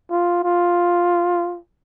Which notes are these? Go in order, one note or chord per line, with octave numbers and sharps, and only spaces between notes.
F4
F4